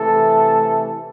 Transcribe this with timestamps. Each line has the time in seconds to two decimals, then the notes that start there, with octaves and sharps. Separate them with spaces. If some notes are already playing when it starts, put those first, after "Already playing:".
Already playing: C3 E3 A3 A4